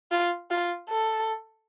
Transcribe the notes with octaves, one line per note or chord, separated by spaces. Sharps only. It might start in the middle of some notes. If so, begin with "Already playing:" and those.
F4
F4
A4